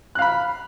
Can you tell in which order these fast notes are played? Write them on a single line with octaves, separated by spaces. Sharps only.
F#6 F5 B5